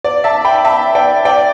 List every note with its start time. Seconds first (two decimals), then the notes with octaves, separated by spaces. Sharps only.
0.04 D5
0.24 E5 A5
0.45 G5 B5
0.65 E5 A5
0.95 D5 G5
1.25 D5 G5